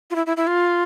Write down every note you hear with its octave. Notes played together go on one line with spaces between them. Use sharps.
F4
E4
E4
E4
F4